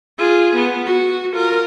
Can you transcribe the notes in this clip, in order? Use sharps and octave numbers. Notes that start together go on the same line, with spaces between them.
F4 G#4
B3
F#4
F4 A#4